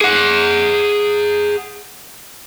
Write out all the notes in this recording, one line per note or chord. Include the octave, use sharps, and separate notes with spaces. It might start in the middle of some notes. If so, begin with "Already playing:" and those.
G#4 F#5